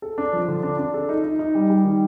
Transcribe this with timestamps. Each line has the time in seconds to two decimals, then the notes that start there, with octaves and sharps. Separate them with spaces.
0.02 A4
0.18 D4
0.33 F3
0.48 D3
0.63 D4
0.78 D4
0.94 A4
1.09 D#4
1.24 D#4
1.39 D#4
1.55 G3
1.70 G3
1.85 D#3